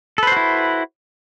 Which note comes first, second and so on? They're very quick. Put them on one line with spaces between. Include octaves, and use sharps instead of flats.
A4 B4 C5 F#4 E4